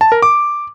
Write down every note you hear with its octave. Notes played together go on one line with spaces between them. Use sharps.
A5
A#4
D6